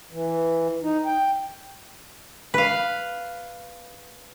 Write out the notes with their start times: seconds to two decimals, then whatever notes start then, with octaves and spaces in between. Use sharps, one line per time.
0.12 E3
0.83 D#4
1.06 G5
2.54 B4 F5